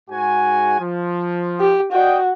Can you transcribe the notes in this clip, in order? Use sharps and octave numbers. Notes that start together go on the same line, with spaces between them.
G#2 F#4 G#5
F3
G4
F#4 D5 D#5 G5